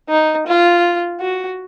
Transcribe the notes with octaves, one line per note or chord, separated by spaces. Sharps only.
D#4
F4
F#4